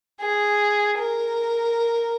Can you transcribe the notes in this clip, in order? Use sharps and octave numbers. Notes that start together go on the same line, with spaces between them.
G#4
A#4